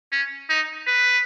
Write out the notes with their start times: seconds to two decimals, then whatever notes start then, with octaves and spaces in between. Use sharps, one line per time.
0.12 C#4
0.49 D#4
0.87 B4